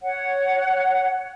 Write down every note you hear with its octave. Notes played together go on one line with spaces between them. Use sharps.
C#5 F#5